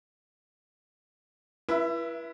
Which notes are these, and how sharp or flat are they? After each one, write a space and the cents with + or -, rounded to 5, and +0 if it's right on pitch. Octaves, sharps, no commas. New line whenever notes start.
E4 +30 B4 -30 E5 +0